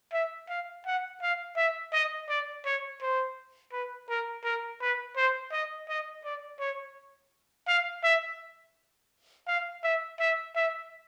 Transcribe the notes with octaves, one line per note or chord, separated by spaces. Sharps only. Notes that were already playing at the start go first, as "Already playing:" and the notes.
E5
F5
F#5
F5
E5
D#5
D5
C#5
C5
B4
A#4
A#4
B4
C5
D#5
D#5
D5
C#5
F5
E5
F5
E5
E5
E5